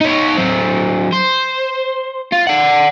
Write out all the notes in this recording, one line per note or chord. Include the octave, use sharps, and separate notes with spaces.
D#4 C#5
F#3 C4
C5
F4
D5 F#5